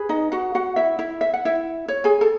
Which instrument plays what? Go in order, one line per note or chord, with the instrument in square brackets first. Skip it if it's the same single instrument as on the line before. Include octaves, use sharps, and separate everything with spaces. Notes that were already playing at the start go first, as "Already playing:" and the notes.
Already playing: [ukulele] G#4 B4
D#4 D#5
F#4 F#5
F#4 F#5
E4 E5
E4 E5
E5
F#5
E4 E5
C#5
G#4 G#5
A4 A5